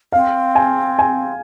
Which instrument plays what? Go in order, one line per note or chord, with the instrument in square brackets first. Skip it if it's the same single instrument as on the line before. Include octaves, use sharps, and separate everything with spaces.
[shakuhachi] C4 [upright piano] F5
[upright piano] G#5
G#5